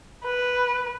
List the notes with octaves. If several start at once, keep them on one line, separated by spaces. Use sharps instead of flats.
B4